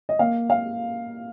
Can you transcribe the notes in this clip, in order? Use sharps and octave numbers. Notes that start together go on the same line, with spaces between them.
D#5
A#3 F5
A#3 F5